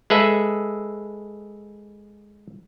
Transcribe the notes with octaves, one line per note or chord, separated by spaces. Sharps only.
G#3 G#4 A4 B4 E5